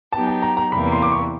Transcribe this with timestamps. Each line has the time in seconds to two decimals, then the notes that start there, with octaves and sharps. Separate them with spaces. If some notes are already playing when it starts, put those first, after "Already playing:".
0.12 F#3 B3 D#4 G4 A5
0.27 A5
0.42 A#5
0.57 A#5
0.72 E2 C3 E3 G3 A#3 B5
0.92 C6
1.02 D6
1.12 C#6